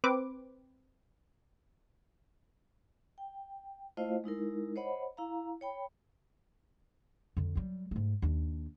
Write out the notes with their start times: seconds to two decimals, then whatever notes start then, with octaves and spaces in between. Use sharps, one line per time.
0.04 C4 B4 D6
3.18 G5
3.97 A3 E4 F4 C5 D#5 F5
4.24 G#3 D#4 E4 A#4
4.76 C5 C#5 D#5 F#5 B5
5.17 E4 F5 A#5
5.61 C#5 G5 B5
7.37 F2 D3
7.55 F#3 G3
7.91 G#2 A3
8.22 D#2 D4